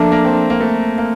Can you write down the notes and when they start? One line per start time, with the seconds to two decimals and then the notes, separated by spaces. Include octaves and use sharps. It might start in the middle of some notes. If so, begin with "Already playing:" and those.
Already playing: F3 A3 A#3 D4
0.12 A#3
0.25 C4
0.50 A#3
0.61 A3
0.98 A#3